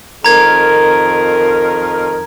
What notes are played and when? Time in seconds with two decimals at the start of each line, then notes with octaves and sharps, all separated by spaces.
0.25 F2 D#3 A#4 A#5 G#6